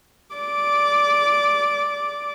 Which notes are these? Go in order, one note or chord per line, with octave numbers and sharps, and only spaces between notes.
D5 D6